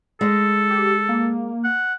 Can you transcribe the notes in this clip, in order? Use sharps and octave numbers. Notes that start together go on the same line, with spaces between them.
G#3 A4
G4
A#3
F#5